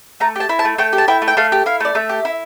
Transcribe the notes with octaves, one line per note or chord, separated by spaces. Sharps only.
A3 A#5
G4 A5
E4
A5
A3
A3 G5
G4
A5
E4 G5
A3
G5
A3 F5
G4
E4 F5
A3 D5
A3 E5
G4
E4